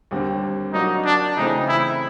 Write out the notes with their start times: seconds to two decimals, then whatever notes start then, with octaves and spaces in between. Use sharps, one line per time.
0.11 D#2 D3 G3 C4
0.74 F#3 A#3 D4 D#4 F#4
1.05 D4
1.37 C#3 E3 A3 C4 D#4
1.68 E4